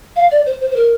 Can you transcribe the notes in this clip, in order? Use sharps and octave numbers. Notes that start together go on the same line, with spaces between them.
F5
D5
C5
C5
C5
A#4